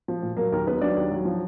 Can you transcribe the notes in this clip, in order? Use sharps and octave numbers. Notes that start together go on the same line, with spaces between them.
F3
A#2
F#3 A#3 A#4
D#2 A#3 A#4
D#2 B3 B4
F#3 D4 D5
D#2
F#3
F3